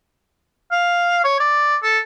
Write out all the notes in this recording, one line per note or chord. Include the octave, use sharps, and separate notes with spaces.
F5
C#5
D5
A4